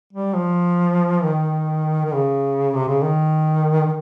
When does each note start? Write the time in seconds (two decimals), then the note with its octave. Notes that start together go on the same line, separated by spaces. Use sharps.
0.13 G3
0.34 F3
1.24 D#3
2.05 D#3
2.13 C#3
2.74 C3
2.88 C#3
3.02 D#3
3.86 D#3